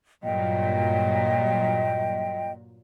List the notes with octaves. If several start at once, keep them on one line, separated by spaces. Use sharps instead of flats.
G2 A#2 F#3 D#5 G5